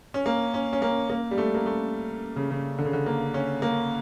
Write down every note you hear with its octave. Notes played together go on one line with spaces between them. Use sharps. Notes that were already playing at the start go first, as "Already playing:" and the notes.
C#4
A#3
C#4
C#4
A#3
A#3
G3
A3
A#3
A3
C#3
C#3
D3
C#3
D3
A#3
C#4
A#3